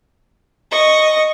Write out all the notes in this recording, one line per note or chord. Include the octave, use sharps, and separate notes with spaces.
D#5 C#6